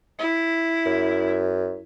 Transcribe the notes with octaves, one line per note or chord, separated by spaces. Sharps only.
E4
F#2